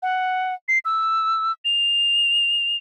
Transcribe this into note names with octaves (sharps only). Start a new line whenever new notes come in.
F#5
C7
E6
F7